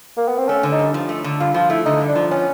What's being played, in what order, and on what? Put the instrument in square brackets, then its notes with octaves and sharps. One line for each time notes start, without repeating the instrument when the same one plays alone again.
[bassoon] A#3
B3
C4
[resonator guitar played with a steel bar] A3 [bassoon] C#4
[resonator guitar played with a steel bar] D3
[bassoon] D#4
[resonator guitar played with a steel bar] G2
F3
A3
D3
[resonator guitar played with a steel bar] G2 [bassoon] F4
[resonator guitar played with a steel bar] F3 [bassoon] F4
[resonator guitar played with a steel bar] A3 [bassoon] E4
[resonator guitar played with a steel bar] D3 [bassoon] D#4
[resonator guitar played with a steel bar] G2
[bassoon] D4
[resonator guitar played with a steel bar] F3
[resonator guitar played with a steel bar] B3 [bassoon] C#4